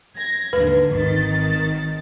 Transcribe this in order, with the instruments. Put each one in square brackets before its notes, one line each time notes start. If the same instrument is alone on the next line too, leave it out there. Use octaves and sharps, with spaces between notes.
[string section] G#6 A#6
[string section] D#2 G#2 D3 [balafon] B4
[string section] G#1 D#3 A6